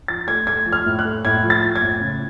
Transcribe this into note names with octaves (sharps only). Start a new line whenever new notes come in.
F3 A6
A3 G#6
A3 G#6
F3
F6
A2
F#6
A3
A2 G#6
F3
A6
F3
G#6
A2
C#3